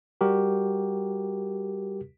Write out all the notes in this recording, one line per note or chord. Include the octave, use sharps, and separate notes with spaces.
G3 F#4 G4 A#4